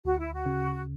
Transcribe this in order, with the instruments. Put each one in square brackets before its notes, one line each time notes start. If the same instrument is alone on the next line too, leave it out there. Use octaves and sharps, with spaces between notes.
[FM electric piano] D2 [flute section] F#4
[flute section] E4
F#4
[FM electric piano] C#3